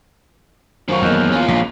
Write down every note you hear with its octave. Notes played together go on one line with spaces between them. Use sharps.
F#2 D#3 C5 F5 C#6
E2 A#3 A#4 D#5
C#4 F4
A#1 G#2